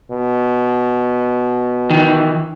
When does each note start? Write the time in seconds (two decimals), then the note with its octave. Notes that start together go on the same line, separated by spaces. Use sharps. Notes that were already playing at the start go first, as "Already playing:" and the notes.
0.11 B2
1.90 D#3 E3